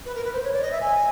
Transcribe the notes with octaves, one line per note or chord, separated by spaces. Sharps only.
B4
A#4
B4
C5
C#5
D5
D#5
E5
G#5